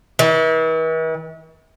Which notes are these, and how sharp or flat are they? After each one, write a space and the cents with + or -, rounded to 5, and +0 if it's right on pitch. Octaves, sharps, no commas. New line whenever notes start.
E3 -45